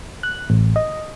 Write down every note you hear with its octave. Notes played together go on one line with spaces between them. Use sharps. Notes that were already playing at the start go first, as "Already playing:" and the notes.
F#6
A1
D#5